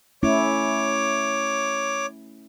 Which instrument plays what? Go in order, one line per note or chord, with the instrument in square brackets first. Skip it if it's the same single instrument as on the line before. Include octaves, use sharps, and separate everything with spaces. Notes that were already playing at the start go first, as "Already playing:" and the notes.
[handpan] A3 C#4 E4 [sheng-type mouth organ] C#5 D6